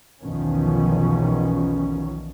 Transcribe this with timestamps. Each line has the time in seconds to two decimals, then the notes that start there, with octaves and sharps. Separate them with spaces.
0.22 B1 E2 B2 D#3 F3 C#4